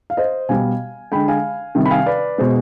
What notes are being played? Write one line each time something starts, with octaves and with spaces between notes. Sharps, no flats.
F5
C5 D#5
B2 G3 F5 G#5
D3 G#3 G5 B5
F5 G#5
C3 D#3 G3
B5
F5 G#5
B4 D5
B2 G#3 C5